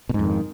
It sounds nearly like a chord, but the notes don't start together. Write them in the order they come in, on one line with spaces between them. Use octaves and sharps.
B2 G#2 F2 D#3